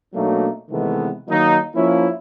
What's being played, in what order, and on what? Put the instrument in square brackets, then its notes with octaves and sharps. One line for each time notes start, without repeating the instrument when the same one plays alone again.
[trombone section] B2 F#3 A3 A#3 D4 D#4
C3 D#3 E3 G#3 A3 B3
D#3 F#3 A#3 D#4
F3 A#3 C#4 E4